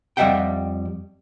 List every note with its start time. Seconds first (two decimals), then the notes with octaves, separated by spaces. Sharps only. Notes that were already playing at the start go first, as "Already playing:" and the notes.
0.17 F2 G3 D#5 E5 F#5 G5